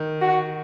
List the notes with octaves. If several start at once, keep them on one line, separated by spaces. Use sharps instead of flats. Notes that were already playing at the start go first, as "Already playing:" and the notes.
Already playing: D#3
F#4